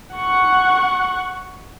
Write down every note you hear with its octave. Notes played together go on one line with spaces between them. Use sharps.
F#5 C#6